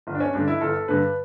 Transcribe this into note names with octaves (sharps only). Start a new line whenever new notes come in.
G1
D4
C#4
G2 D3 D4
E4
G1 A4
G2 D3 B4